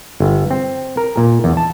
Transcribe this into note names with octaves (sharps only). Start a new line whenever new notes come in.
G1
C4
A#4
A#2
E2
A5